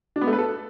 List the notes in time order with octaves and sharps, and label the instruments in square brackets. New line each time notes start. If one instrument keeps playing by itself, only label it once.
[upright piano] D4
B3
A3
B4
A4